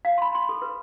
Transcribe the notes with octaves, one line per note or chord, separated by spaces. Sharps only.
F5
B5 C6
B5 C6
A4
B4